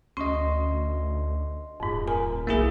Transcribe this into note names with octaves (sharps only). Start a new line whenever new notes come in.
D2 C#4 D#5 C6
D#1 F2 G#2
A#4 G#5
B1 A#3 E4 G#4